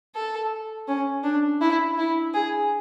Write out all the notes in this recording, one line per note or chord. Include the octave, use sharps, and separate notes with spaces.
A4
C#4
D4
E4
E4
G#4